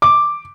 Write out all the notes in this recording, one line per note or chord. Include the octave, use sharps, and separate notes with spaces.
D6